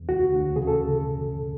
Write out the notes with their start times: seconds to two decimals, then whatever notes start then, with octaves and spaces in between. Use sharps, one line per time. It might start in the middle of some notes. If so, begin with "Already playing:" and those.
Already playing: E2
0.09 D2 F#4
0.33 D2
0.56 C#3 G#4
0.67 A4